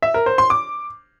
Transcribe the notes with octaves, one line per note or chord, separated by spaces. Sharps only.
E5
A#4
C5
C6
D6